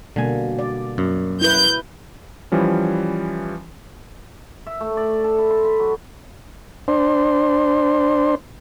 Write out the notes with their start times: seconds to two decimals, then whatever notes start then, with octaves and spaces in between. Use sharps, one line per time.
0.16 B2 D3 G3 A#3 G#5
0.59 D5
0.98 F#2
1.41 E4 B4 G6
2.52 E3 F3 G3 C#4
4.67 E5
4.81 A3
4.97 D5
5.24 A4
5.39 B5
5.50 C6
5.65 B5
5.80 F#3
6.88 D4 C5